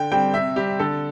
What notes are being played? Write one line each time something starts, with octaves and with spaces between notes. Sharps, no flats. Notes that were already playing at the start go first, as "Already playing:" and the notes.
Already playing: D3 G5
G3 C4 G5
C3 E5
G3 C4 G4
D3 A4